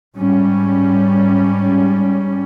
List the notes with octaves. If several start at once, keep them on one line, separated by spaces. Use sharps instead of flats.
G#2 G3 C#4